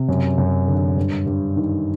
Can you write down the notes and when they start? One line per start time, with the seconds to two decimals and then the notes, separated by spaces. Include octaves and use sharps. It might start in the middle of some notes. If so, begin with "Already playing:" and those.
Already playing: C3
0.09 F#2
0.38 F#2
0.67 D3
0.97 G2
1.26 G2
1.56 D#3